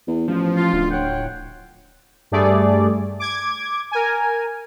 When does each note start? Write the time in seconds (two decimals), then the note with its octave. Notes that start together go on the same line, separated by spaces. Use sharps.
0.07 E2
0.28 A1 F3
0.57 F4
0.73 D1 D2
0.91 C#5 F#5 G5
2.31 G2 G3 A3 G#4 D5
3.19 D6 G#6
3.91 A#4 G#5